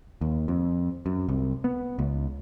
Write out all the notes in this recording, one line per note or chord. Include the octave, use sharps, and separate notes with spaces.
D#2
F2
F#2
C2
B3
C#2